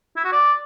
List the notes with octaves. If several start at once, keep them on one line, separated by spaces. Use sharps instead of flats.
E4
F#4
D5